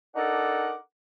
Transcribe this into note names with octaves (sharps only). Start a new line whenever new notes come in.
D4 D#4 A4 A#4 F#5 D6